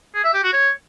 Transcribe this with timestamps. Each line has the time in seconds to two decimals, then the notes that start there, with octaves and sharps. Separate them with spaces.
0.14 G#4
0.24 E5
0.34 G4
0.43 F#4
0.53 C#5